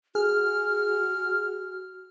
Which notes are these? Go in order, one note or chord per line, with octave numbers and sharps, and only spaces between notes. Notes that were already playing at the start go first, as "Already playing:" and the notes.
F#4 G#4 F6